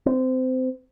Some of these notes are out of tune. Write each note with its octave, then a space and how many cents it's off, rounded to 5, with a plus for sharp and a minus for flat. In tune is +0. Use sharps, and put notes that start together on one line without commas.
C4 -25